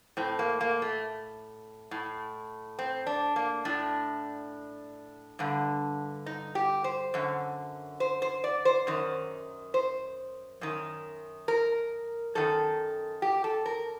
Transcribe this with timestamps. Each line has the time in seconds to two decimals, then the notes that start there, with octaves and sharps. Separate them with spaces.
0.17 A2 C4
0.39 A#3
0.61 A#3
0.82 A3
1.91 A2
2.79 C4
3.07 D4
3.36 A#3
3.65 A2 D4
5.39 G2 D3
6.26 D#4
6.55 G4
6.84 C5
7.14 F#2 D3
8.00 C5
8.22 C5
8.44 D5
8.65 C5
8.87 F#2 D#3
9.74 C5
10.61 F#2 D#3
11.48 A#4
12.35 F#2 D#3 A4
13.22 G4
13.44 A4
13.66 A#4